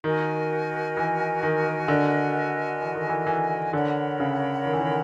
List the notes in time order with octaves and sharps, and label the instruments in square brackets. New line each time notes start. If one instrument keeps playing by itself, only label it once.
[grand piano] D#3 [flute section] F#4 A#4 D#5 G#5
[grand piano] E3
D#3
D3
E3
D#3
E3
E3
[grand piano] D3 [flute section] A#4 C#5 F#5 B5
[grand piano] C#3
D#3
E3
D#3